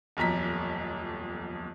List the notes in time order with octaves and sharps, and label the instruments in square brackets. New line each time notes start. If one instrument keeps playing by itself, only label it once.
[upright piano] D#1 B1 F2 A#5 B6